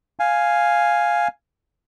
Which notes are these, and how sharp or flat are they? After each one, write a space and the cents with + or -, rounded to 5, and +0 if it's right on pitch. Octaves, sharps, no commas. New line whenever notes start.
F5 +0 G#5 +0